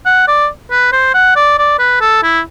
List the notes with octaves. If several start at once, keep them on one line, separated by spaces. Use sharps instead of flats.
F#5
D5
B4
C5
F#5
D5
D5
B4
A4
E4